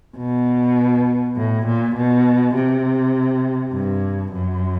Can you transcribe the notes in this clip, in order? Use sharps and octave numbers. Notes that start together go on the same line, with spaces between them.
B2
A2
A#2
B2
C3
G2
F#2